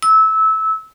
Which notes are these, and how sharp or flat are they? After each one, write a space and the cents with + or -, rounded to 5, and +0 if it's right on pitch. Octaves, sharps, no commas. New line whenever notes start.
E6 -20